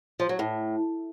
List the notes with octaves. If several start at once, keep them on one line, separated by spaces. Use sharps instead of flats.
F3
F#3
A2